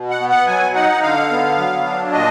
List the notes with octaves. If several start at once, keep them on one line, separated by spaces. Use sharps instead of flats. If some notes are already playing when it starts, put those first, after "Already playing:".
Already playing: B2
F#5
B3
F#5
F#3 G#5
D#4 F#5
D3 F5
B3
F#3
D4
A#2 D#5